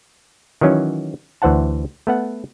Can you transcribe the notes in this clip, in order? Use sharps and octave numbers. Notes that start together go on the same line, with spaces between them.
D#3 E3 F#3 C#4
D2 E3 C5 F#5 A5
A3 B3 F#5